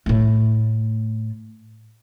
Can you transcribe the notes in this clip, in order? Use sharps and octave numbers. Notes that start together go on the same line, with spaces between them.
A2 A3